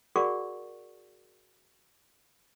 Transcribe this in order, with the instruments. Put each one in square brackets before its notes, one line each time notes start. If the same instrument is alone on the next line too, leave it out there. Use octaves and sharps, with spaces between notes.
[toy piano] F#4 G#4 A#4 D5 F#5 C#6